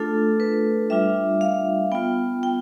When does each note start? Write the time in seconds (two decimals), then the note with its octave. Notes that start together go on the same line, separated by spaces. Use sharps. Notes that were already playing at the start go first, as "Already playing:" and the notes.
Already playing: A3 D4 F4 A4
0.40 B4
0.90 G3 D4 F4 E5
1.41 F5
1.92 B3 F4 G5
2.43 G5